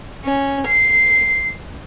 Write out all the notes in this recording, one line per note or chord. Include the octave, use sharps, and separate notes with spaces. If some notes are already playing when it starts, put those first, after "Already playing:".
C#4
C7